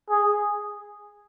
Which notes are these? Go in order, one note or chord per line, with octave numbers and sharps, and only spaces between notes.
G#4